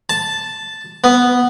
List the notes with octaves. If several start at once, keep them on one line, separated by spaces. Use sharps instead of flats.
A5
B3